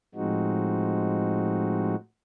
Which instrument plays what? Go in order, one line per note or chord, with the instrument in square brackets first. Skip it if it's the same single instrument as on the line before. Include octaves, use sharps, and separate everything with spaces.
[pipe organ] A2 F3 G#3 C4 D#4 F#4